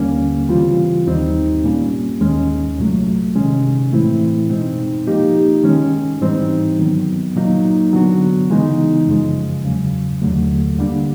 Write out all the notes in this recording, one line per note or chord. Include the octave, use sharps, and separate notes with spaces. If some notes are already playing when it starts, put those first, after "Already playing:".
Already playing: D#2 D3 G3 A#3 C#4
C#3 E3 G3 C4 F4
D#2 D#3 G3 C4 D#4
A#2 G3 A#3 C#4
D#2 D#3 G#3 C#4
C2 A#2 F#3 A3
C3 D#3 G#3 C#4
A2 E3 A3 C4 E4
B2 G#3 C4 D#4
A#2 F3 A#3 D#4 G4
D#3 G#3 C#4
G#2 E3 G3 C4 D#4
D#3 F#3 B3
A#2 F#3 A#3 D#4
D3 F#3 B3 D4 F#4
C#3 E3 G#3 B3 D#4
F#2 C#3 F3 G#3
E2 C#3 F#3
D#2 D3 F#3 A3
D3 G3 A#3 D4